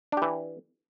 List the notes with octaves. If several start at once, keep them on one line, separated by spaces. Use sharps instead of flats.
E3 D4 G4